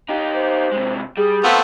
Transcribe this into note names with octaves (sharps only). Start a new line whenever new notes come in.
D#4 G4
C5
C3 G#3
G3 G#4
A#2 A3 B3 C4 F4